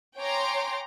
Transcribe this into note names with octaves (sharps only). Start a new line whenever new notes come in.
C#5 G5 G#5 A#5 C6 D6